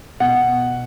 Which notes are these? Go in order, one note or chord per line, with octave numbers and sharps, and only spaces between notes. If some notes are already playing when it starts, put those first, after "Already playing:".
B2 F#5